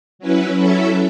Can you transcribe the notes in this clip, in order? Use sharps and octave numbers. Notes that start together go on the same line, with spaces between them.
F#3 C#4 E4 B4
F#3 C#4 E4 A4 E5